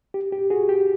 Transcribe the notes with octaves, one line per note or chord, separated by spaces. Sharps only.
G4
G4
F#4 G#4
G4